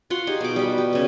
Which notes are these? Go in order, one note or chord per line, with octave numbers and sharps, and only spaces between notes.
F4 F#4 F#5 C6
D#4 G4 G#4
B2 D6
G3 B5
G4
C#3 B3